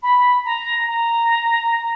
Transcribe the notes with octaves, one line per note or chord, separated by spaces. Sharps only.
B5
A#5
A#5